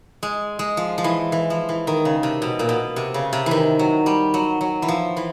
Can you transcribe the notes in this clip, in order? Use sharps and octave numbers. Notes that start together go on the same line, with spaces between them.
G#3
G#3
F3
F3
E3
E3
F3
E3
D#3
C#3
C3
B2
A#2
B2
C3
C#3
C3
D#3 E3
F#3
G3
F#3
F#3
E3
F3
E3